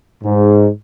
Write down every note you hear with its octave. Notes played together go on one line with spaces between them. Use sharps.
G#2